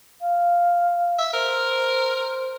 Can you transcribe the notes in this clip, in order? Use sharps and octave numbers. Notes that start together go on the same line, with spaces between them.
F5
E5
A#4 C5